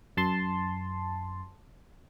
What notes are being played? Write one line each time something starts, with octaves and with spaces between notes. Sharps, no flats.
F#2 A5 C6